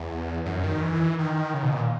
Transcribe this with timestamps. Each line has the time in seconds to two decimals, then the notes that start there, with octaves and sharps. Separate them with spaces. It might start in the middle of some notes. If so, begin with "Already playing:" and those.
Already playing: E2
0.46 F#2
0.63 D#3
0.82 E3
1.19 D#3
1.54 C#3
1.63 B2
1.72 A#2